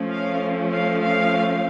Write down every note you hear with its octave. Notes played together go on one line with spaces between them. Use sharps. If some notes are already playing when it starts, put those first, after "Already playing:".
Already playing: F3 A3 C#4
F5
F5
F5